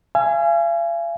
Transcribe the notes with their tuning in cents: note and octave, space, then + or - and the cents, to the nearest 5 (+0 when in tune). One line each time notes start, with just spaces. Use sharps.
F5 -45 G#5 +0